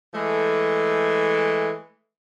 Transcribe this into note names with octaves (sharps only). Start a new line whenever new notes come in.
E3 G#3 A3